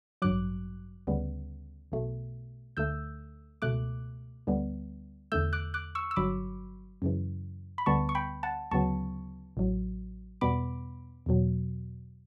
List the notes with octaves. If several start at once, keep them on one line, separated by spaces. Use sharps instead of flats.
A1 G2 F#3 D6 F#6
D2 C#3 G3 B3
B1 B2 A3
D2 D3 A3 E6 G6
C#2 B2 A3 D6 F#6
D2 D3 G3 B3
E2 D3 A3 E6 G6
D6 F#6
D6 F#6
C#6 E6
E6
G1 G2 F#3 B5 D6
F#2 C#3 E3
B5
D2 D3 G3 B3 A5 C#6
C#6
G5 B5
F#5 A5
D2 C#3 F#3 B3 A5 C#6
A1 A2 F#3
E2 B2 G3 B3 B5 D6
E2 B2 F#3